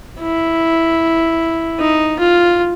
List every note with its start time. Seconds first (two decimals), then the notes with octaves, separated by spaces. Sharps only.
0.20 E4
1.79 D#4
2.19 F4